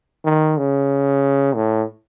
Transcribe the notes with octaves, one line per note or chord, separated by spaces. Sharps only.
D#3
C#3
A2